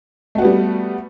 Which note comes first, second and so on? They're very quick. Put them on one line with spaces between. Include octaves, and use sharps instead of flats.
A3 F#4 B3 G3